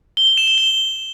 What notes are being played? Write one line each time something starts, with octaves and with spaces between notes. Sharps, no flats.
G7
G7
E7
G7
G7